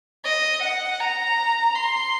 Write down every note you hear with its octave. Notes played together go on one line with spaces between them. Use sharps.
D#5
F#5
A#5
C6